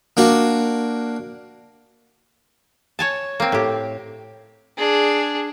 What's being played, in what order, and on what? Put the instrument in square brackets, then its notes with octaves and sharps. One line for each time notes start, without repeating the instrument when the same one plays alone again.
[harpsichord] A#3 D4 F#4
[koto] C#5 G#5 A5
A#3 C4
A2 G4
[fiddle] D4 G#4